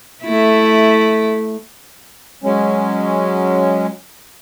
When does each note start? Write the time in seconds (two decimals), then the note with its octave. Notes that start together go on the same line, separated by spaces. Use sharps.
0.24 A3 E4
2.44 F#3 G#3 C#4